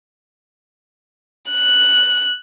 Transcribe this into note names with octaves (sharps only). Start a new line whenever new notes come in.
F#6